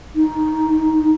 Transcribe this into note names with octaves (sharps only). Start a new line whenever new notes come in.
D#4